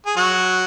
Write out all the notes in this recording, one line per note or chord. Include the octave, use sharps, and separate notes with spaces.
G#4
F#3 F#4